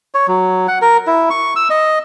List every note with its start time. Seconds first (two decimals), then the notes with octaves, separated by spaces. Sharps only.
0.15 C#5
0.28 F#3
0.68 F#5
0.82 A#4
1.07 E4
1.30 C#6
1.56 E6
1.70 D#5